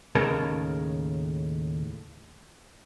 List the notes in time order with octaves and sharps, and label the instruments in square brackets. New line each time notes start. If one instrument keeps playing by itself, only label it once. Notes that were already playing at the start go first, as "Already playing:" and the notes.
[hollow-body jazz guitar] D#2 A2 C#3 A#4 A5